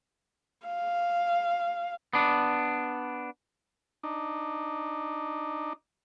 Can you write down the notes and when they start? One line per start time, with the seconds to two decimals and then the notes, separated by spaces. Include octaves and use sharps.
0.67 F5
2.13 B3 D4
4.03 D4 D#4